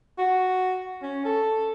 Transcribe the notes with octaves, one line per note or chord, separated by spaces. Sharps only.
F#4
C#4
A4